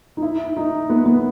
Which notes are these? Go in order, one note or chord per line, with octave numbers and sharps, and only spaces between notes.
D#4
E4
D#4
B3
B3